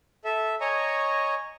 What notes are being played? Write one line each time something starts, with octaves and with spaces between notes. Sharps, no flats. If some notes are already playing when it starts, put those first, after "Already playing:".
A4 E5
C#5 D#5 G#5 A#5 C#6